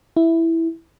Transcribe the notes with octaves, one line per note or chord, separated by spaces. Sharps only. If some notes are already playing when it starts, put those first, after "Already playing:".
E4